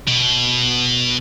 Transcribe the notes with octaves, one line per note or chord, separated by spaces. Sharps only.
B2